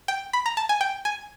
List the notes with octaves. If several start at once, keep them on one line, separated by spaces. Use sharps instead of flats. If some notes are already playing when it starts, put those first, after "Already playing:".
G5
B5
A#5
A5
G#5
G5
G#5